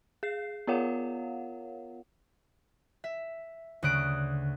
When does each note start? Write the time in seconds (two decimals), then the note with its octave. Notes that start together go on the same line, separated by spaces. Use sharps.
0.23 G#4 C7
0.67 B3 F4 A#4 C#5 F5 F#5
3.04 E5
3.82 D2 C#3 D#6 F#6 D7